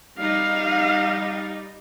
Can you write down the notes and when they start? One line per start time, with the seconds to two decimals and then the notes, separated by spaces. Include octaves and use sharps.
0.19 G3 D#4 F5